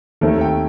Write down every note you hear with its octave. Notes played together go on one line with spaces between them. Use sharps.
D#2 D#3 A3 C4 A4
G5